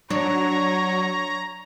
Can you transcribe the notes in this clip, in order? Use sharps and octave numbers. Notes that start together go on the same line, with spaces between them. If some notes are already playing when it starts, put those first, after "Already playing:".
F#3 D4 C#5 A#5